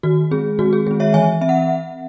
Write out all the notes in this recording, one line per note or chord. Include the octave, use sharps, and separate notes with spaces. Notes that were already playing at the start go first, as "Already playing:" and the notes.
D#3 F#4
G#3 C4 G#4
D#3 F#4
G#4
G#3 C4 G#4
C#5 E5
E3 E5 G#5
C4 E5
F#5